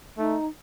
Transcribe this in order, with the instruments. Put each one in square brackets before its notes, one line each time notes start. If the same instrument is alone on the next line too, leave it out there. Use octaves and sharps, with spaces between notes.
[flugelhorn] A3 [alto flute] D#4